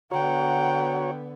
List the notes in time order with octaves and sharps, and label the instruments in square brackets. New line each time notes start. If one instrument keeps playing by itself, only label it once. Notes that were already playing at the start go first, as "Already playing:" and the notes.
[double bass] D3 B3 [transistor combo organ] F#4 C#5 [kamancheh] F#5 G5 [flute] A#5